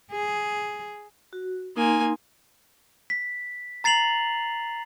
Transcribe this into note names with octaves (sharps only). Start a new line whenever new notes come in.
G#4
F#4
A#3 D#4 G#5 C6
B6
A#5 A6 C7 F7 F#7